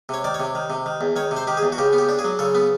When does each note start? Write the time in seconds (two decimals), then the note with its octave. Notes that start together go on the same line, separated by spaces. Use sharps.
0.09 C3 C#5
0.24 D#3 D5
0.34 C#5
0.40 C3
0.55 D#3
0.70 C3
0.86 D#3
1.01 E2
1.16 D#3 C#5
1.31 C3
1.37 C5
1.47 D#3 G4
1.57 G#4
1.63 E2
1.72 F#4
1.78 C#3 G4
1.93 B3
1.98 G4
2.09 D4
2.19 G#4
2.24 F#3
2.39 C#3 A4
2.55 B3